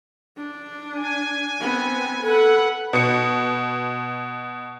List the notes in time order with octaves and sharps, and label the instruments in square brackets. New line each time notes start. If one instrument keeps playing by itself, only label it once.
[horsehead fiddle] D4
[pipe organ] G#5
[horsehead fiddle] B3 C4
[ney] A4 [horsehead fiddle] B4 [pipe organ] F#5
[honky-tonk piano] B2 C#7